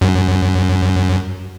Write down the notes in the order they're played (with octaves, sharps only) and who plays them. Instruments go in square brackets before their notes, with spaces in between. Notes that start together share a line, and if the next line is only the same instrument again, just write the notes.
[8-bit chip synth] F#2